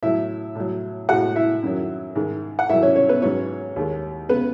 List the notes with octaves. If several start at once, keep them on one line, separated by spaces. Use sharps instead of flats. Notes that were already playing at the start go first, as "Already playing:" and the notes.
A2 F#3 E4 E5
A2 F#3
A2 G#3 F#4 F#5
E4 E5
F#2 D#3 F#3
G#2 D#3 G#3
F#5
G#2 D#3 F#3 E4 E5
C#4 C#5
C#4 C#5
B3 B4
G#2 F#3 C#4 C#5
D#2 D#3 G#3
C#3 G#3 B3 B4